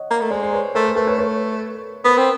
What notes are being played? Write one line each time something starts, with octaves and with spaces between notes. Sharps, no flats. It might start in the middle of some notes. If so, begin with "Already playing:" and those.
Already playing: C#5 D#5 F#5
A#3
A3
G#3 C5 D5
C5
B4 C#5
A3 A#4 C5
A#4
A3 A4 B4
B4 C#5
B4 C#5
B3 A#4 C5
C4